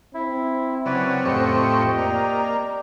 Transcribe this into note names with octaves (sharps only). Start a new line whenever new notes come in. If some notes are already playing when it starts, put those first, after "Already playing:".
C4 E4
C#3 F#3 B4 D5
F2 A2 G4 C5 D#5 C#6
A#3 D5